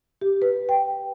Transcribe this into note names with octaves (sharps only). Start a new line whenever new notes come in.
G4
B4
G5